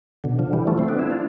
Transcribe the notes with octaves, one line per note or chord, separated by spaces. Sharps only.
B2 D3
D3 F3
E3 G3
F3 A3
A3 C4
B3 D4
C4 E4
D4 F4